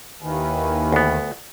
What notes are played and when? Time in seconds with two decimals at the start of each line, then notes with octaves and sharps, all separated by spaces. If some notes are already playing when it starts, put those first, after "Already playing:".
0.22 D#2 D#3 E4 B4 G#5
0.92 D2 B3